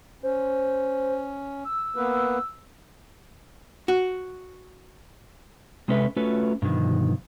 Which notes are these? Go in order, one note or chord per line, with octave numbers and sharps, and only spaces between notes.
C#4 C5
E6
A#3 B3 B4
F#4
C3 G#3 C#4 A4 B4 E5
A3 C#4 F4 F#4 A4 B4
G2 B2 D3 D#3 F3